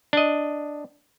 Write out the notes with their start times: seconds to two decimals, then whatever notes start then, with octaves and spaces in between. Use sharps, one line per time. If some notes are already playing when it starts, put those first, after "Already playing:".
0.13 D4 D#5